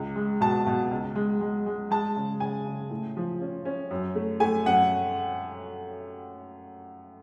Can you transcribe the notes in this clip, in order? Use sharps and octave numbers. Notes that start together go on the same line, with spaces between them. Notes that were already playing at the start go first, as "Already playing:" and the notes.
Already playing: C#2
G#3
B2 A5
B2
C#2
G#3
G#3
G#3
G#3 A5
C#3
C#3 G#5
C#3
A2
F3
C#4
C#4
F#2
A3
A3 G#5
F#2 F#5